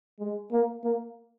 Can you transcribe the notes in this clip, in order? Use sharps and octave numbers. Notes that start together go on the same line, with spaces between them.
G#3
A#3
A#3